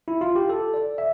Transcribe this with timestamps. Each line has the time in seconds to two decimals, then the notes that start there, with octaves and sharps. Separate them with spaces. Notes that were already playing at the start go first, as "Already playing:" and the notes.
0.08 E4
0.21 F4
0.36 G4
0.49 A4
0.74 D5
0.98 E5